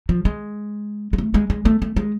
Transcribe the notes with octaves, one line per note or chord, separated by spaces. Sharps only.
F3
G#3
G#3
A3
G#3
G#3
A3
A3
G#3